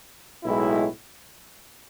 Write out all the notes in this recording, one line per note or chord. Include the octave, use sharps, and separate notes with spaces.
B1 A2 G#3 E4